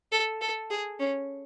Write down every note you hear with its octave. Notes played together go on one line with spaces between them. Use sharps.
A4
A4
G#4
C#4